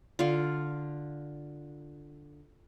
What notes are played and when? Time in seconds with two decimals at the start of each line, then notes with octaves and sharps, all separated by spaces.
0.19 D3 F4